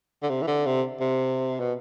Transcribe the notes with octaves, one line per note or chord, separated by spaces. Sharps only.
D3
C3
E3
D3
C3
C3
B2